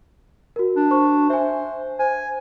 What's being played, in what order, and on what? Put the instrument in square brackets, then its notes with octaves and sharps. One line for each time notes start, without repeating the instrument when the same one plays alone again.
[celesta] F#4 A#4
[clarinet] D4
[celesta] C5 C#6
[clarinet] C5 [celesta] E5 G#5
[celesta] C5 [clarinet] G#5